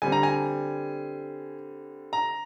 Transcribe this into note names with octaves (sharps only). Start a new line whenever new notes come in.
D3 G3 C4 G#5
A#5
G#5
A#5